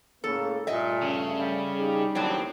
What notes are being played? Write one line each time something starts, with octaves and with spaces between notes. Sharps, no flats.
A2 C#3 A#3 A4
G2 A#2 A3 D#5 E5
C#3
G3
D#4 G4 G#4
D#2 A2 F#3 C4 D4